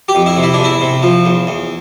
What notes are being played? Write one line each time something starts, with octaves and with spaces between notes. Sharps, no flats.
G4
F2
E4
C3
E4
D4
E2
E4
C3
F3
E2
E2